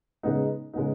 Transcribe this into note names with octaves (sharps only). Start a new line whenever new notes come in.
C#3 G#3 B3 D#4
C#3 G#3 B3 D#4